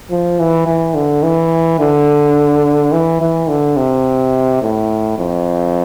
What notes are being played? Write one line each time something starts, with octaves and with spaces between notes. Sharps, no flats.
F3
E3
E3
D3
E3
D3
E3
E3
D3
C3
A2
F2